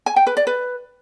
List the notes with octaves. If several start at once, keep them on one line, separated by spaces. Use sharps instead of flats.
G#5
G5
B4
D5
B4